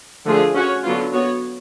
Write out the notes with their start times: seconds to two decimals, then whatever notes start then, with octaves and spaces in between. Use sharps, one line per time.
0.25 D3 F3 A3 F4 G#4
0.54 C#4 F#4 C#5
0.83 D3 F#3 B3 F4
1.13 B3 F#4 C#5